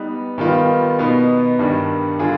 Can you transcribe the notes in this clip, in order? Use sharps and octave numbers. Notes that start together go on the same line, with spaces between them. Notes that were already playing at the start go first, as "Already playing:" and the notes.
Already playing: G3 B3 D#4 B4
D#3 G3 B3 F4
B2 B3 D#4
G2 D#3 G3 D4
D3 G3 D4 F4 G#4